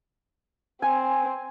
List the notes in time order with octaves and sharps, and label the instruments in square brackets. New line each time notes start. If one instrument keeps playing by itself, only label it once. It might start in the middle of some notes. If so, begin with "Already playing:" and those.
[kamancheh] C4 [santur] G#5